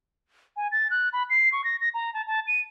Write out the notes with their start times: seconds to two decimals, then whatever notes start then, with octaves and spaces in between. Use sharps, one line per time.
0.56 G#5
0.72 A6
0.90 F#6
1.13 B5
1.30 C7
1.52 C#6
1.64 A#6
1.81 A#6
1.94 A#5
2.14 A5
2.27 A5
2.47 D#7